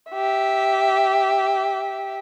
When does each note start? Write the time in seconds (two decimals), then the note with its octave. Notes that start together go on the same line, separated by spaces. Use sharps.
0.12 G4 E5